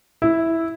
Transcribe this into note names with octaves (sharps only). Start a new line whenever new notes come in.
E4